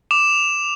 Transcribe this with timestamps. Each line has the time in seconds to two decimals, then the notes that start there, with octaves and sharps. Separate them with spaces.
0.11 D6 E7